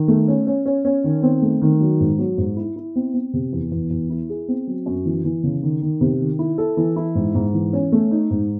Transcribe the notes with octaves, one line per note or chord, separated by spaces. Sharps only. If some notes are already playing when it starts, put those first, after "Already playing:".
Already playing: D#3
A3
C#4
C#4
C#4
C#4
D#3
C4
A3
D#3
F#3
G#2
F#3
G#2
E4
E4
C4
C4
C3
E2
E2
E2
E4
G#4
C4
F#3
F#2
E3
E3
C#3
D#3
D#3
C3
D#3
E4
A4
E3
E4
G#2
G#2
E3
C#4
A3
D#4
G#2